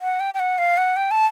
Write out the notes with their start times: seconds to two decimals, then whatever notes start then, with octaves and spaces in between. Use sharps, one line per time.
0.01 F#5
0.20 G5
0.34 G5
0.39 F#5
0.58 F5
0.77 F#5
0.96 G5
1.11 A5